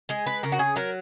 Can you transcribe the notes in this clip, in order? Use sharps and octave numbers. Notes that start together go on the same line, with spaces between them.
G#3 G#4
B4
C#3 A#4
F#4
G#4
F#3 A#4